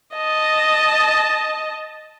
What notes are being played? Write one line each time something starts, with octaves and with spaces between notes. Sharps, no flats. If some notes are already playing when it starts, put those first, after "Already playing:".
D#5 A5